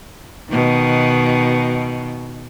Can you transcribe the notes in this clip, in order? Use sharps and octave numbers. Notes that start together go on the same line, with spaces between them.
B2 D#3